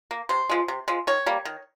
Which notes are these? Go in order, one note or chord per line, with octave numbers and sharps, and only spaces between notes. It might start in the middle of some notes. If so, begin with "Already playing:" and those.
A#3
C3 C5
F3 G#3
C3
F3 G#3
D#3 C#5
G3 A#3
D#3